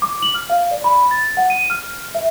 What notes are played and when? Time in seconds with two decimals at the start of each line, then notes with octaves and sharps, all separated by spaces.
0.02 D6
0.22 F#7
0.34 F6
0.50 F5
0.71 D5
0.84 B5
1.11 A6
1.37 F#5
1.50 D#7
1.70 F6
2.15 E5